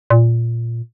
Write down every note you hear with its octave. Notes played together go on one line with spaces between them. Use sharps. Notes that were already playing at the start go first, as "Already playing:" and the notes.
A#2